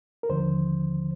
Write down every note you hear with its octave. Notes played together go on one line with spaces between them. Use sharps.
A#4
D#2 D3 F3 C5